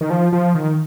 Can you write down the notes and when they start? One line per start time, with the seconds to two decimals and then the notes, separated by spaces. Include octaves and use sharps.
0.01 D#3
0.10 F3
0.33 F3
0.55 D#3